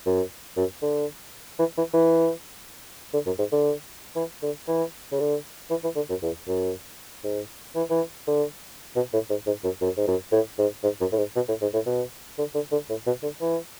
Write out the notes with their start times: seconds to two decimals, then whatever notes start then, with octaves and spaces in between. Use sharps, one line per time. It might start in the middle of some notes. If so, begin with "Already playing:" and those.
0.06 F#2
0.57 F#2
0.82 D3
1.59 E3
1.77 E3
1.93 E3
3.13 D3
3.26 F#2
3.39 G#2
3.52 D3
4.16 E3
4.43 D3
4.68 E3
5.12 C#3
5.20 D3
5.70 E3
5.83 E3
5.96 D3
6.09 F#2
6.22 E2
6.48 F#2
7.24 G#2
7.75 E3
7.90 E3
8.28 D3
8.96 B2
9.13 A2
9.30 G#2
9.46 G#2
9.64 F#2
9.81 F#2
9.97 G#2
10.07 F#2
10.32 A2
10.59 G#2
10.83 G#2
11.01 F#2
11.12 A2
11.18 G#2
11.36 B2
11.48 A2
11.62 G#2
11.74 A2
11.86 B2
12.38 D3
12.55 D3
12.72 D3
12.89 A2
13.06 B2
13.23 D3
13.41 E3